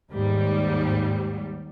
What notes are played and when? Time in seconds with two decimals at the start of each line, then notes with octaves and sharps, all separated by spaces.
0.13 D#2 G#2 G3